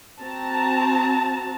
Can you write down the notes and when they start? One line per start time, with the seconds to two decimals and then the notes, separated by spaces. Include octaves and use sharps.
0.21 C4 F#4 A5 A#5